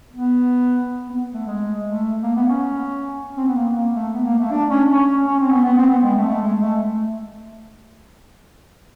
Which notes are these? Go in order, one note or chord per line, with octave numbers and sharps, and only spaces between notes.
B3
B3
A3
G#3
A3
A#3
B3
C#4
C4
B3
A#3
A#3
A3
B3
A#3
A3
D4
C#4
C#4
C#4
C4
B3
B3
C4
B3
G#3
A3
A3
G#3
A3